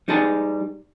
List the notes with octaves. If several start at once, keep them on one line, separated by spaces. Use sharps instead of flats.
G3 D#4 G#4 D#5 A5